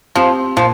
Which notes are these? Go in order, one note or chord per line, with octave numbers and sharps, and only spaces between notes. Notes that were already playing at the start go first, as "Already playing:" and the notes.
F3 C4 G4 C5
A#2 F3